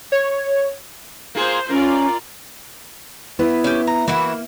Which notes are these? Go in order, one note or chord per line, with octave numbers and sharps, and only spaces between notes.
C#5
A#3 F4 G#4 C5
C#4 F4 A#4 D5
B3 E4 B4
C#4 G4
A#5
E3 A#3 E4 F#4